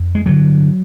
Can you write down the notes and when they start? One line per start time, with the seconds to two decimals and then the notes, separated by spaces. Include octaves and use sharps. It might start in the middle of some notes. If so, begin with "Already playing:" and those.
Already playing: F2
0.15 G#3
0.26 G2 D3 F#3